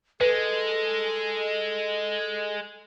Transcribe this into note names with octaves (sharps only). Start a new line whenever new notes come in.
G#3 A4 B4